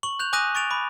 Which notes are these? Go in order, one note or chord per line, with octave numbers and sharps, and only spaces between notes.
C#6 F#7
F#6 G6 F7
G#5 D6 D#6 F#6 A#6 D#7
C#6 A6 D7 F7
B5 D6